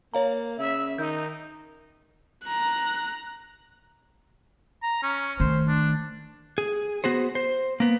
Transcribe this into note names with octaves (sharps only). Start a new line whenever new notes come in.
A#3 C#5 F5 A#5
C#3 E5
D#3 D#4 G6
A#5 F#6
A#5
C#4
D#3 A3 C5
D4
G#4
B3 F#4 G#4 C5
C5
A#3 B3